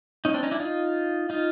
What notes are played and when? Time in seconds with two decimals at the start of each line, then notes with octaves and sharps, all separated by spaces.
0.25 C#4 D#4
0.34 C4 D4
0.43 C#4 D#4
0.51 D4 E4
0.60 D#4 F4
1.30 D#4 F4